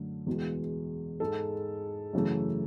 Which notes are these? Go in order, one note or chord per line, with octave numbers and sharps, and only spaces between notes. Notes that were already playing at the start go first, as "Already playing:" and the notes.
Already playing: F#2 D3 A3
E2 B2 G#3
G#2 G#3 A4
F#2 C#3 E3 A3